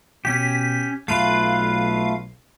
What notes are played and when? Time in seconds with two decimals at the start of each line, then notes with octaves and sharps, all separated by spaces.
0.25 B2 C#4 G4 B6
1.08 B1 A3 F4 B4 F5